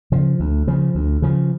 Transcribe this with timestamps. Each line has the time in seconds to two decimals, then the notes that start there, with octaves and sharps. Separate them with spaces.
0.12 C#3 F3
0.40 D2
0.67 C#3 F3
0.95 D2
1.22 C#3 F3